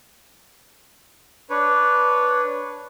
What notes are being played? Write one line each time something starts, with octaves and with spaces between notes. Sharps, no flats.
D4 B4 C#5